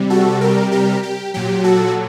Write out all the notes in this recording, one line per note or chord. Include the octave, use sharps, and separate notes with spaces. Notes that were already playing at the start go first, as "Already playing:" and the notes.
Already playing: C3 G3
F#4 A4
G4 A#4
G4 A#4
G4
A#2 F#3 G4
F#4 A4